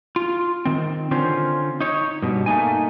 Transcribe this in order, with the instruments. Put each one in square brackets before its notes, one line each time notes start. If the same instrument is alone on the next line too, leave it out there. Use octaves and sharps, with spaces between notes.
[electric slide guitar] F4
D#3 C4
D3 C4 C#4 F4 C5
D#4 C#5
G2 B2
A3 A#3 D#4 G#5